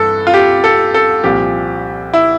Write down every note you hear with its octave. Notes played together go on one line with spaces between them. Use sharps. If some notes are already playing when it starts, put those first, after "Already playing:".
Already playing: G2 E3 A4
F4
G4
A4
A4
C2 A#2 F3 G4
E4